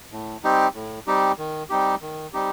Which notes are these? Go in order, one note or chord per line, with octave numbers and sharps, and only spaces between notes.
A2
G3 C4 D#4 G4
A2
G3 C4 D#4 G4
D#3
G3 C4 D#4 G4
D#3
G3 C4 D#4 G4